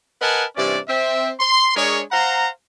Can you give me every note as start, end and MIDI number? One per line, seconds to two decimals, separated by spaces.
0.21 0.44 70
0.21 0.44 71
0.21 0.44 75
0.21 0.44 78
0.21 0.44 80
0.21 0.44 81
0.56 0.78 43
0.56 0.78 48
0.56 0.78 52
0.56 0.78 61
0.56 0.78 74
0.88 1.30 60
0.88 1.30 76
1.40 1.73 84
1.76 2.01 56
1.76 2.01 62
1.76 2.01 68
1.76 2.01 70
1.76 2.01 73
2.12 2.48 72
2.12 2.48 77
2.12 2.48 78
2.12 2.48 82